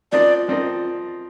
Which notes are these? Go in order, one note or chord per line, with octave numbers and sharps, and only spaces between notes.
F3 C4 D#4 A#4 D5 D#5
F3 C4 D#4 A#4 D#5